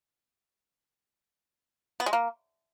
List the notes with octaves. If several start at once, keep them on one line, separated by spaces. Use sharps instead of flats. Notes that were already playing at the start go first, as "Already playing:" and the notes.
B3
G#3
A#3